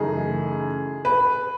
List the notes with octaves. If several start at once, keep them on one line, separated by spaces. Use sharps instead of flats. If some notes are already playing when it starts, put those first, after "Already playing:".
Already playing: F#2 C#3 E3 A3 D#4 G#4
B4